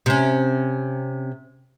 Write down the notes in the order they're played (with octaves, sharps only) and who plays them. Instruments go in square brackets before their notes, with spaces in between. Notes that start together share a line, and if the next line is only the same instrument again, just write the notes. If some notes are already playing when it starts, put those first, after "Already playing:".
[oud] C3 C#4